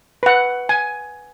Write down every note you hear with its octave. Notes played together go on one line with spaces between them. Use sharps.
B4 F#5
G#5